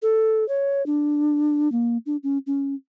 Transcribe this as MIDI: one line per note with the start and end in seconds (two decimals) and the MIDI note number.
0.02 0.47 69
0.49 0.85 73
0.86 1.71 62
1.72 1.98 58
2.06 2.17 62
2.23 2.38 61
2.47 2.75 61